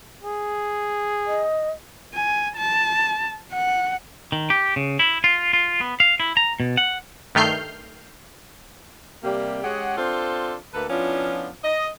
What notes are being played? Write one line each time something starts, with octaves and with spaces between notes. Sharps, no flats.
G#4
D#5
G#5
A5
F#5
D#3
G4
C#3
E4
F4
F4
B3
F5
E4
A#5
B2
F#5
G2 D#3 A3 F6 G6 C7
C3 G3 A#3 G4
G#3 C#4 G4 G#4 F#5
C4 D4 F4 A4 C5
D2 A#3 A4 B4
F3 B3 C#4 D4 E4 F4
D#5